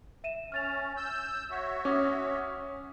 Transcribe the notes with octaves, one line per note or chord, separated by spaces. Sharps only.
E5 D#7 E7
C#4 F6 A6 F7
E6 G6
F#4 C#5 E5
C#4 D6 D#6